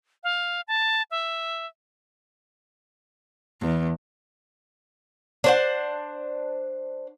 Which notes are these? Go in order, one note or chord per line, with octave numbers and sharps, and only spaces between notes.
F5
A5
E5
E2
D4 C5 F#5